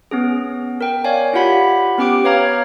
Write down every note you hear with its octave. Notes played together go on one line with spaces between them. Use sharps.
B3 C#4 G#4
A#4 G5
C#5 D5 F5 G#5
E4 F4 G4 F#5 B5 B6
B3 C#4 G4 G5 D6 D7
B4 C#5 F5 A#5 F6 G#6